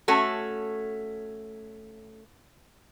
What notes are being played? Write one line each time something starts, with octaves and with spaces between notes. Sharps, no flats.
A3 C#4 F#4 A4